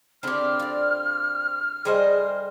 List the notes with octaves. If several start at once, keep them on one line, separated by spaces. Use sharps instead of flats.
D3 C4 E4 G4 G#4 F6
F4 D5
G3 A3 G#4 C5 D#5